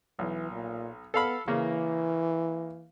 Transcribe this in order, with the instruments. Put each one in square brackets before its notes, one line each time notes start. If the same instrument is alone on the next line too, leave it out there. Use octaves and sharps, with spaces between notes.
[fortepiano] B1 [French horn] E3
[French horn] A#2
[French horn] B3 [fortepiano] A4 F5 B5
[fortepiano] C#3 A#3 [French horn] E3